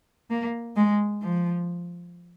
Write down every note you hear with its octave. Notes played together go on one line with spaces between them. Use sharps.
A#3
G#3
F3